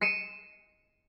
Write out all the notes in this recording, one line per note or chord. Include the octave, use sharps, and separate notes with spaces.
C7 C#7 D#7 E7